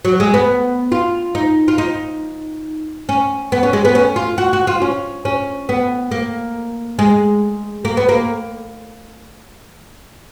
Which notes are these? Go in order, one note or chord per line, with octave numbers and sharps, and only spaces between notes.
F#3
G#3
B3
F4
D#4
F4
D#4
C#4
B3
C#4
G#3
B3
C#4
F4
F#4
F#4
F4
C#4
C#4
B3
A#3
G#3
A#3
B3
A#3